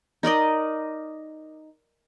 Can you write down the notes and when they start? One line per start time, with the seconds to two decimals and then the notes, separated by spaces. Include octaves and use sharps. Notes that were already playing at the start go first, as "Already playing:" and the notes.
0.23 D#4 A#4 D5 D#5